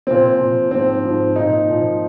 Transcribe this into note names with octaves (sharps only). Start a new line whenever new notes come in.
A#2 F3 C4
A#2 F3
G#2 F3 C4
G#2 F3
A#2 F3 D#4
A#2 F3